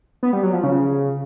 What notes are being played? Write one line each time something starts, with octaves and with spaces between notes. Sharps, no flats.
B3
G3
F#3
F3
C#3